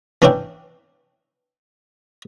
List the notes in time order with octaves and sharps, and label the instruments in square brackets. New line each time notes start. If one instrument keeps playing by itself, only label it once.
[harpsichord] E3 C#4 D4 E4 G5